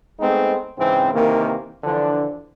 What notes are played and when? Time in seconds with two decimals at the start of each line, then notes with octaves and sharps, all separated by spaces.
0.20 G#3 A3 B3 C4 D#4
0.78 G#2 C#3 E3 C4
1.13 C3 D#3 E3 A#3
1.84 D3 E3 F3 D4